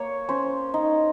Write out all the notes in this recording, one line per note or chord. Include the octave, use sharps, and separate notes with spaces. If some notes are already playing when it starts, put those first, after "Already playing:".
Already playing: A#3 C#5
C#4 C5
D#4